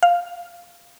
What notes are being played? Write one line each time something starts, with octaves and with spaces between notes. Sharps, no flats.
F5